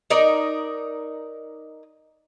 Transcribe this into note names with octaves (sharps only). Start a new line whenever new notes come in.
D#4 A#4 D5